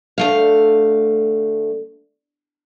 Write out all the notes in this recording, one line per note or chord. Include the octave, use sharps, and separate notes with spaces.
D2 A3 F5